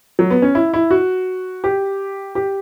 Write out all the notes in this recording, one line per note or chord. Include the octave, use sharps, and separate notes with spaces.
F#3
B3
C#4
E4
E4
F#4
G4
G4